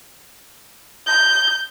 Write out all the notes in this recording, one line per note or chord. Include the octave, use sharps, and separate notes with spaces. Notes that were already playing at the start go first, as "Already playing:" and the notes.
G6